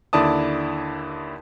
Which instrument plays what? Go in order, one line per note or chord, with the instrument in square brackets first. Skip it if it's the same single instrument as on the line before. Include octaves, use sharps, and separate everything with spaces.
[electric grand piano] D#2 D3 E4 D5 A5 D#6